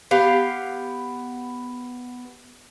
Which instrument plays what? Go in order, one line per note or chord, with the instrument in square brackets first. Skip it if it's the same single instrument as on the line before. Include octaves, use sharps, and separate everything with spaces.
[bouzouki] B3 G4 F5